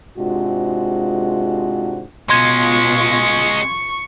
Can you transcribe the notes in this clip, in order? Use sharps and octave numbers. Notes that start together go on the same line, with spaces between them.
G#2 C3 G#3 D4 F4 F#4
B2 G#3 C#4 F4 C6 C#6 G#6